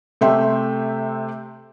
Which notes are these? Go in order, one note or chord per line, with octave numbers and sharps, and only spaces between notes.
C3 A3 G4 E5 G5 C6